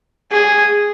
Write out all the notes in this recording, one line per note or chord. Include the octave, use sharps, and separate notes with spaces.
G#4